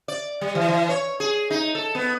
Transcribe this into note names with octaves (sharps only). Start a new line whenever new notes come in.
D5
G3
E3
E3
C#5
G#4
D#4
A4
B3